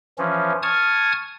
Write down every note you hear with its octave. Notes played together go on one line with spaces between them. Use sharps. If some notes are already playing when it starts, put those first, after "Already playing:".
E3 F3 C#4
G#5 A5 C#6 D#6 F6 G#6